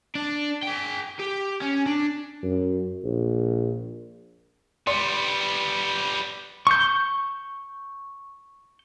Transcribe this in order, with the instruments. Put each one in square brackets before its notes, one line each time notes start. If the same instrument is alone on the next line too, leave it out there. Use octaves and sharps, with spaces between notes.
[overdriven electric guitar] D4
G#4 G5
G4
C#4
D4
[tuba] F#2
A#1
[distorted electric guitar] G3 B3 [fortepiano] D5 C6
[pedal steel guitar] C#6 G6